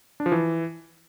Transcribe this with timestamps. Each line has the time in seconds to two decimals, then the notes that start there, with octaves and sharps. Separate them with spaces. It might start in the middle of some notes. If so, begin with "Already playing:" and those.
0.20 D4
0.26 F3
0.32 E3